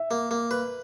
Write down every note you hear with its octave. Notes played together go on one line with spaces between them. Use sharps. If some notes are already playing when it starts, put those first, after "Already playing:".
Already playing: E5
A#3
A#3
B4